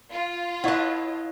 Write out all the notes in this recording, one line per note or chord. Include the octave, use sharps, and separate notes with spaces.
F4
E4 B4 C#5 D#5 F#5 A5 C#6